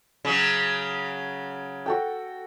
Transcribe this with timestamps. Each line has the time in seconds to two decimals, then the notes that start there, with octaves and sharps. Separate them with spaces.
0.25 C#3 F#3
1.86 F#4 A4 G5